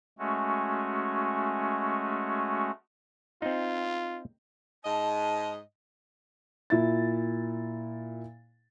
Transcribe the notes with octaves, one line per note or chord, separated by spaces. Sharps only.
G#3 A3 C#4 F#4
C4 D#4 F4
G#2 D#5 A5
A#2 E4 A6